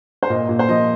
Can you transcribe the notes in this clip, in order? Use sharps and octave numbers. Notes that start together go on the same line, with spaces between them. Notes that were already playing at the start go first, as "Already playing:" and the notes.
C5
A#2 D#5
A#2
C5
F3 D#5